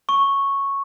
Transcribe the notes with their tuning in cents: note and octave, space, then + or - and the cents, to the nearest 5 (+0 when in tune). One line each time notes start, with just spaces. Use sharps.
C#6 -5